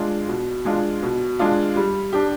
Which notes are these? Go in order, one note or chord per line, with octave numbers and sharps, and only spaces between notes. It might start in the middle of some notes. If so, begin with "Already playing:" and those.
Already playing: G#3 D4 F4
B2
G#3 D4 F4
B2
G#3 D4 F4
G3
D4 G4